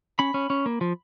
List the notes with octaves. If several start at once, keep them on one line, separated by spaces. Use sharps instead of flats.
C#4 B5
C#4
C#4
A#3
F3